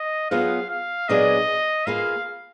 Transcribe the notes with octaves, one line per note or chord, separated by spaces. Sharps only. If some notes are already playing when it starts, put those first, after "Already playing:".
Already playing: D#5
F#3 B3 F4 G#4 B4 F5
F5
A#2 F#3 B3 D4 G#4 D#5
A#3 F4 G#4 B4 F5